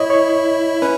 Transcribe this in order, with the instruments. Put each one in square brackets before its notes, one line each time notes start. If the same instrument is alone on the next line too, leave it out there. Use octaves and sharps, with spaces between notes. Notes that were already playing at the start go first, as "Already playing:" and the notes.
Already playing: [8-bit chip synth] E4 [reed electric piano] C#5 D#5
[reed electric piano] C#5
[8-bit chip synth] C#4 [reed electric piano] B4